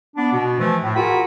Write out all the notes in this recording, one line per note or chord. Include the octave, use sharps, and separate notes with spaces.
B3 D4
B2
E3 F3 A3
A2
F4 F#4 G#4 A#4 B5